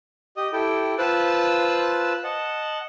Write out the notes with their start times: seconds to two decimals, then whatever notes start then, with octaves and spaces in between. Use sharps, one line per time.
0.37 G4 D#5 D#6
0.53 E4 G4 A4 G5
0.98 F4 B4 C5 A5 E6 F#6
2.24 D#5 F#5 A5